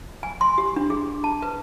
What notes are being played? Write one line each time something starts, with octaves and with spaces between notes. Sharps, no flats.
G#5
C6
G4
D4
G#4
A5
B4